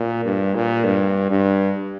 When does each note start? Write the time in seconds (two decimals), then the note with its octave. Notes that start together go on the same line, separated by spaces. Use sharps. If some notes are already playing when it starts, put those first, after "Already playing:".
Already playing: A#2
0.25 G2
0.55 A#2
0.85 G2
1.31 G2